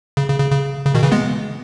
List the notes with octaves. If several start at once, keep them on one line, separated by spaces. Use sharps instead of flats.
C#3
C#3
C#3
C#3
C#3
B2 D#3
C#3 E3
G#3 B3